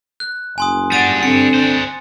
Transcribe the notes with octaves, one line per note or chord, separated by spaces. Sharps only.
F#6
F#1 G#5 C6 D#6
G3 D4 F#5 A6 D#7
D3 C4 C#7
D4 C5